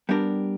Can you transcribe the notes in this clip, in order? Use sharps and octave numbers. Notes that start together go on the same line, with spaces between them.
G3 B3 D4 G4 A#4